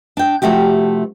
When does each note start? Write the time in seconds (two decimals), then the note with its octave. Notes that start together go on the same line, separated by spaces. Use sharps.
0.17 D4 G5
0.42 C3 F3 A3 F#4 G4